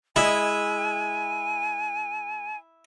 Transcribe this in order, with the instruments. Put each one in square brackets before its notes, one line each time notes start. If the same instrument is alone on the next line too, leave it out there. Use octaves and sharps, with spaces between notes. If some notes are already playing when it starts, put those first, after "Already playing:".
[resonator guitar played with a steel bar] G#3 [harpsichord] E4 [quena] G#5